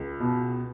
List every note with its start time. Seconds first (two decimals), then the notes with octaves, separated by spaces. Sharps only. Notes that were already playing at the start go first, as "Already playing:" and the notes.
Already playing: C#2
0.20 B2